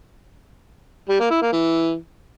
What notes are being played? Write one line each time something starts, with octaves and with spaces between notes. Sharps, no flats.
G3
A#3
E4
A#3
E3